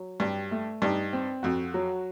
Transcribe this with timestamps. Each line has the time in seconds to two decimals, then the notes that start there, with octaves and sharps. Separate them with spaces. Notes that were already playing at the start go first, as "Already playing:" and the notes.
Already playing: F#3
0.20 G2 G4
0.51 A3
0.82 G2 D#4
1.13 C4
1.43 F2 F#4
1.74 F#3